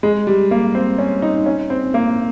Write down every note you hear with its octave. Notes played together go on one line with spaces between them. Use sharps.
G#3
G3
A#3
C4
C#4
D#4
C#4
C4
A#3